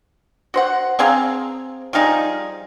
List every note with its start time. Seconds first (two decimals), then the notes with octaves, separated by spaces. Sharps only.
0.54 F#4 C5 F#5
0.99 C4 G#4 F5 A#5
1.93 F3 G3 D#4 G#4